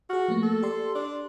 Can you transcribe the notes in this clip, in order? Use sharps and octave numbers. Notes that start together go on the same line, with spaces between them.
F#4 G#4 F6
F3 A3 A#3
A4
G4 D5 C6
D4